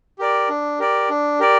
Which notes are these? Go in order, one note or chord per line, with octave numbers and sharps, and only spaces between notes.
G4 A#4 D5
D4
G4 A#4 D5
D4
G4 A#4 D5